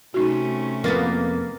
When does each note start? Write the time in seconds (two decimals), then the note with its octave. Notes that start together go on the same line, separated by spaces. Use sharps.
0.14 C3 A3 C#4 D#4 F#4
0.84 F2 A#3 B3 A6